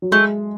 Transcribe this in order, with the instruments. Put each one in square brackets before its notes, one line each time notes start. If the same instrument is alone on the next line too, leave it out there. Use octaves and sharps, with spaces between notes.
[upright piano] F#3
[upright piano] G#3 [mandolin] A3